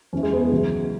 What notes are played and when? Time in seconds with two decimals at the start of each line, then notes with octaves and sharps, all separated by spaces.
0.13 E2 C#4
0.16 E3
0.23 G#3
0.33 B3
0.42 G#3
0.51 C#2 C#3 E3 F#3